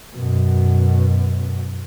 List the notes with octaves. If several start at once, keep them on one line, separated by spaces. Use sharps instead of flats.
F#2 B2